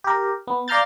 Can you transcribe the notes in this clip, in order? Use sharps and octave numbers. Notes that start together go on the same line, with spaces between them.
G4 A#4
B3
D5 F5 A#5 F6 G6 A6